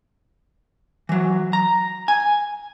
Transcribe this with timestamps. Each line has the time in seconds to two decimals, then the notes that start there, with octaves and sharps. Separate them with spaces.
1.09 E3 F#3
1.53 A#5
2.08 G#5